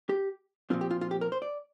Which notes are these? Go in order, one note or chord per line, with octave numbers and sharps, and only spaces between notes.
G4
A#2 F3 C4 F4
G4
F4
F4
G4
A#4
C5
D5